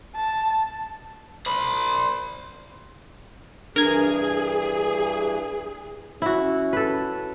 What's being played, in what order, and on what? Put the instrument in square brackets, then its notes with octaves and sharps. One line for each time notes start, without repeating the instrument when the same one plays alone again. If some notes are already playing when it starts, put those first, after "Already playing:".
[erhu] A5
[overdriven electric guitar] C5 B5
[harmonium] G2 E3 [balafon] D4 [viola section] G#4 [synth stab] A#4 G#6
[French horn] C#4 [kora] E4 F#4
[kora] A4 B4